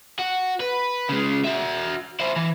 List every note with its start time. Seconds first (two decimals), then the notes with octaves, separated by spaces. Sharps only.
0.19 F#4
0.60 B4
1.09 C#3 G#3
1.45 F#4 E5
2.20 E4 C5
2.36 E3